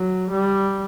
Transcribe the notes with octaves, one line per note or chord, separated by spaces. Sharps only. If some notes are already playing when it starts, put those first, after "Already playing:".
Already playing: F#3
G3